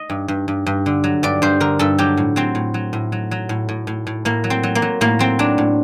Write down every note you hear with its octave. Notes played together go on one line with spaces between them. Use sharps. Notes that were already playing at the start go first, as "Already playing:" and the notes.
Already playing: D#5
G2
G2
G2
G2
D3
F#3
G2 D5
G2 C5
D3 A#4
G2 A4
F#3 G4
A2
F#3 C4
A2
F#3
A2
F#3
F#3
A2
A2
A2
A2
A2 A#3
F#3
C4
F#3
A#3
F#3
A2 A#3
F#3 C4
F#3 D4
A2